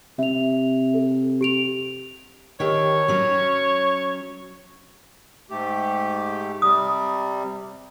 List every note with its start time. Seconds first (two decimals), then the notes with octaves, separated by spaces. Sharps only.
0.19 C3 E5 F7
0.94 A4
1.41 G4 D7 F7
2.60 D#3 G4 A4 C#5
3.08 F#3 C#4
5.50 G#2 A3 G4
6.62 C3 G3 D#6